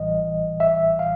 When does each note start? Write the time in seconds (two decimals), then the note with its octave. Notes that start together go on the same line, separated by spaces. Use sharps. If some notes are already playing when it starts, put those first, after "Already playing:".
Already playing: A1 A2 E3 G3 D#5
0.60 E5
0.99 F5